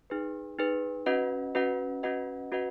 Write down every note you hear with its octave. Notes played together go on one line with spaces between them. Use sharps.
D#4 G#4 B4
D#4 G#4 B4
C#4 F#4 B4 D#5 F#5
C#4 F#4 B4 D#5 F#5
C#4 F#4 B4 D#5 F#5
C#4 F#4 B4 D#5 F#5